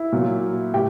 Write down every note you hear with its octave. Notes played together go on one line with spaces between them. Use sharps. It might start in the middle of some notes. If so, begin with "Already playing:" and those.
Already playing: E4 E5
A#2 F#3 A#3
A2 G4 G5